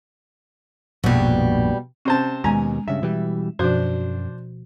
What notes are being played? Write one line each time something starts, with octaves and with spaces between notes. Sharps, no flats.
A#1 F2 G#2 B2 G3
C3 C#4 C5 A5
D#2 B2 G#3 G#5 A#5
G2 C#3 E5
B2 E3 G3
F#2 B2 F3 D4 F#4 C5